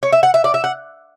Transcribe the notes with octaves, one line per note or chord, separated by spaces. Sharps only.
C#5
E5
F#5
E5
D5
E5
F#5